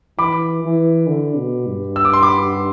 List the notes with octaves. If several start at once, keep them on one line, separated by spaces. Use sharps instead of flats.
E3 B5 D6
E3
D3
B2
G2
E6
D6
C6
B5 D6